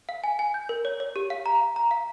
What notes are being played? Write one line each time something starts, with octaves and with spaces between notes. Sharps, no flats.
F5
G#5
G#5
G6
A#4
C#5
C#5
G4
F5
A#5
F5
A#5
F5